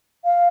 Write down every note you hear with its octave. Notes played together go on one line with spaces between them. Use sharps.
F5